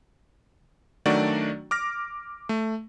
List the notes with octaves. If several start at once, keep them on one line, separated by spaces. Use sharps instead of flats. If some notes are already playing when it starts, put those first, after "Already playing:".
D#3 F#3 A3 D4 F#4 D5
D6 F6 A#6
A3